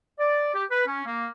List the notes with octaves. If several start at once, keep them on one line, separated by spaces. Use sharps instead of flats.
D5
G4
B4
C#4
A#3